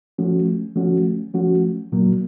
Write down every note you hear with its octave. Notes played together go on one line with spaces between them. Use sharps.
F3 A3 C#4 F#4
F3 A3 C#4 F#4
F3 A3 C#4 F#4
A#2 F#3 A#3